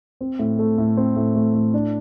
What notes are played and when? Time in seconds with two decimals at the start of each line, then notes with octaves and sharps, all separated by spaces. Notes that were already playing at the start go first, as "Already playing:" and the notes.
0.21 C4
0.39 A2
0.59 A3
0.78 A2
0.97 C4
1.16 A2
1.36 A3
1.54 A2
1.74 D4